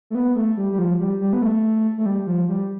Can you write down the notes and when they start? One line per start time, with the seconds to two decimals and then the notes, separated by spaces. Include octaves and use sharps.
0.10 A3
0.15 B3
0.35 A3
0.57 G3
0.72 G3
0.78 F3
0.99 G3
1.21 G3
1.33 B3
1.42 A3
1.98 A3
2.06 G3
2.27 F3
2.49 G3